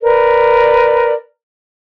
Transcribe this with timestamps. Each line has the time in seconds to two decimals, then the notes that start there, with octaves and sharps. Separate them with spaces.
0.02 A#4 B4 D5